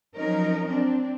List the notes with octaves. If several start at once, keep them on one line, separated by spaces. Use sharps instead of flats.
F3 F#3 C#4 D#4 A#4
C4 D4